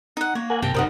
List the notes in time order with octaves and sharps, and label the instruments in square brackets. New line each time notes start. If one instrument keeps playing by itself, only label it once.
[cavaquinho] D#4 F#5
[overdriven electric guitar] A#3 [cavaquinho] C#5
[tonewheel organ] A#4 F#5 G#5
[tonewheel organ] G2 C3 [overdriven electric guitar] A#4 A5 [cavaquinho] G5
[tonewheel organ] G2 C3 C5 [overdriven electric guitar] G3 D#4 [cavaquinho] A#4 D#5 F#5